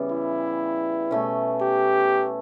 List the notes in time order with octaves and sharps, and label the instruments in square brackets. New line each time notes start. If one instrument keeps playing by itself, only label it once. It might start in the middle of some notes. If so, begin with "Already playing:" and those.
Already playing: [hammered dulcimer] C#3 E3 G3 B3
[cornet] E4
[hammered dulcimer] B2 A3 C#4
[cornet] G4